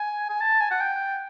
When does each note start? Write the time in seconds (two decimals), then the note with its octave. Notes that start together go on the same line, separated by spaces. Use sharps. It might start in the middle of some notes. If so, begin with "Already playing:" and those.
Already playing: G#5
0.29 G#5
0.40 A5
0.61 G#5
0.71 F#5
0.80 G5